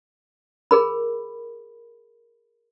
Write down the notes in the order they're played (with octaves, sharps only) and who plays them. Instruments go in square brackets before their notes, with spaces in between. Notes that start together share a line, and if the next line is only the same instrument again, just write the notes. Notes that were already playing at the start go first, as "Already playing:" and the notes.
[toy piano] G#4 A#4 B5